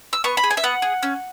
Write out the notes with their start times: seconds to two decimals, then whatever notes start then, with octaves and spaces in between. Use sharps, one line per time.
0.13 E6
0.24 B3 C#6
0.37 B5
0.44 G#4
0.51 G#5
0.57 E5
0.63 B3 F#5
0.82 G#4
1.03 C#4